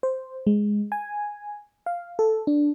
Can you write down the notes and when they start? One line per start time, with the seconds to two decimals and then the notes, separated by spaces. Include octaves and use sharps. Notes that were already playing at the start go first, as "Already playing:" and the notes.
0.03 C5
0.47 G#3
0.92 G#5
1.86 F5
2.19 A4
2.47 D4